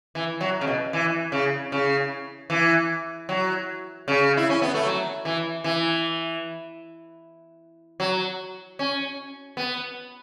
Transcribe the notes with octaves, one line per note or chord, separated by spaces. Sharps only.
E3
F#3
C#3
B2
E3
C#3
C#3
E3
F#3
C#3
E4
C#4
B3
A3
F#3
E3
E3
F#3
C#4
B3